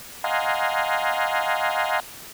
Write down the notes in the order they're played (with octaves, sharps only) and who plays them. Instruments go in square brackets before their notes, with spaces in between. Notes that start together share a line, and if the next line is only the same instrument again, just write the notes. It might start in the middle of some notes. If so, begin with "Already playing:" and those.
[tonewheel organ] D#5 F5 F#5 G#5 A#5 C6